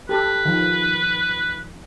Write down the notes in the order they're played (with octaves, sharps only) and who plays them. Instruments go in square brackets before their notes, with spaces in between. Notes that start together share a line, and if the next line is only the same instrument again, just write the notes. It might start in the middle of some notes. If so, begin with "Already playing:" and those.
[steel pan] G4 A4 [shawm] B4
[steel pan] D#3 F3